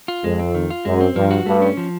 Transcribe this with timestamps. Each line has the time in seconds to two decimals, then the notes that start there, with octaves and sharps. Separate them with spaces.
0.08 F4
0.24 F2 G#3
0.39 C4
0.55 D#3
0.70 F4
0.85 F#2 G#3
1.01 C4
1.15 G2 F3
1.31 F#4
1.46 G2 A3
1.62 C#4
1.77 F3